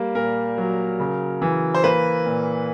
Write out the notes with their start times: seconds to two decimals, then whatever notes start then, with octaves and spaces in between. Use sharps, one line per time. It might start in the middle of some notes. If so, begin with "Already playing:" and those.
Already playing: G3 A#3
0.15 A#2 A#4
0.58 F#3
1.00 C#3
1.42 E3
1.74 C5
1.84 A#3 B4
2.26 A#2